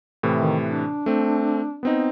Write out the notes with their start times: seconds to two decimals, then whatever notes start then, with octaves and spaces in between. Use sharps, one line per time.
0.23 A2 C3 E3
0.38 D#3
0.66 D4
1.06 A3 C4
1.83 B3 C4 D#4